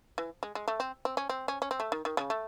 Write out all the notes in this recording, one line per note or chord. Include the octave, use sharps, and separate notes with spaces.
E3
G#3
G#3
A3
C4
C4
C#4
C4
C#4
C#4
C4
A3
D#3
D#3
C#3
A3